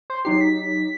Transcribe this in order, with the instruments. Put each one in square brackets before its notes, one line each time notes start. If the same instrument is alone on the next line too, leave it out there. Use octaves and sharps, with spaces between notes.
[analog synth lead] C5
[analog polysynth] F#3 D#4 G4 [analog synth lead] C7
[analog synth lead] B6